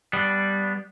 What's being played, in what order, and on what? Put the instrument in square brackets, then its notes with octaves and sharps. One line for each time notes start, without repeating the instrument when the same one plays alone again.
[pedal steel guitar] G3 [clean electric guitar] B3 D4